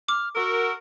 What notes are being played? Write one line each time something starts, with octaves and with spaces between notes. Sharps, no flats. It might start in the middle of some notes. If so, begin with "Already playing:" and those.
D6 F6
F#4 A#4 E6